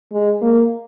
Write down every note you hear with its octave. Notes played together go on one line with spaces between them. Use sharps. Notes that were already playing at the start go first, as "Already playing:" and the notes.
G#3
A#3